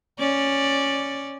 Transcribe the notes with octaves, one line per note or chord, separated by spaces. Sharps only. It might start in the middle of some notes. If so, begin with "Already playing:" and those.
C#4 D5